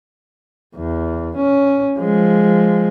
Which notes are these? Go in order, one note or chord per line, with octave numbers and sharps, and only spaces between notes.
E2
C#4
F3 G#3